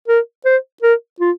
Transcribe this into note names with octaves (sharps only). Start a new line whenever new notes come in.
A#4
C5
A#4
F4